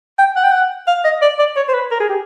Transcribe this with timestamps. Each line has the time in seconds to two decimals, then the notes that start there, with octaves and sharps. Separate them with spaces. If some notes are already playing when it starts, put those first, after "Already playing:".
0.18 G5
0.36 F#5
0.43 G5
0.51 F#5
0.87 F5
1.05 D#5
1.22 D5
1.39 D5
1.56 C#5
1.68 C5
1.74 B4
1.91 A#4
2.00 G#4
2.09 G4